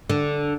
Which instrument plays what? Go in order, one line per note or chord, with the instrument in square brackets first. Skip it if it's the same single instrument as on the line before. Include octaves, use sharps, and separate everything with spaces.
[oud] D3